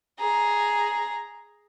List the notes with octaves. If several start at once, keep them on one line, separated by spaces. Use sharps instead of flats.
G#4 A#5